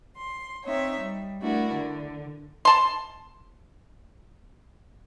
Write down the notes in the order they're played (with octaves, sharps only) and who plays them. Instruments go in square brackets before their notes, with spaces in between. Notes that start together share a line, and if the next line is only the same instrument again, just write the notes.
[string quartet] C6
C4 D#4 C#5 E5
G3
A3 D4 E4 F#4 A#4
D3
[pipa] A5 C6